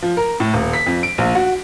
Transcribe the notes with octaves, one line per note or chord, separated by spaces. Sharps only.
F3
A#4
A2
D#1
B6
F2
D7
A#1
F#4